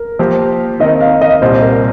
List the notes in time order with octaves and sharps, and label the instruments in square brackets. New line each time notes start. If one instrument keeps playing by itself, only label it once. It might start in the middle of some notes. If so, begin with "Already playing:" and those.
Already playing: [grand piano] A#4
[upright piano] F3 A#3 G4 C5
[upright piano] D#3 C4 D#4 A#4 [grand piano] D#5
[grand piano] F5
D#5
[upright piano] C2 A#2 G3 [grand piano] C5
[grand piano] A#4